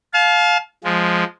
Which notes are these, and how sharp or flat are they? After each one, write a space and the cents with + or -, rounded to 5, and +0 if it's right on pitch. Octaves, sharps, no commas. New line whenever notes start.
F5 +15 A5 -35
F3 +0 G#3 +0